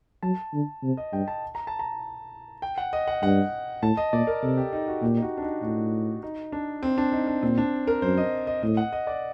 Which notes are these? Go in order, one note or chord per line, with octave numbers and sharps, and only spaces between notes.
F#3 A5
D3
C3
D#5
G2 G5
A5
A#5
A5
A#5
G5
F#5
D#5
F#5
G2 F#5
A2 A5
D#5
A#2 D5
A#4
C3 A4
G4
D#4
F#4
A#2 G4
D#4
F#4
D4
D#4
A2 F#4
D#4
D4
C4
D4
D#4
D4
A#2 C4
D4
A#4
F#2 C5
D#5
D#5
A2 D#5
F#5
D#5
D5